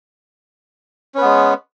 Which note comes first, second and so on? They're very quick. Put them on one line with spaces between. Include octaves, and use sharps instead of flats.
C#4 B4 B3 G#3